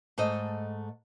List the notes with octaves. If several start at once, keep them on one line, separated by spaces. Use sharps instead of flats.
G#2 A3 A4 D#5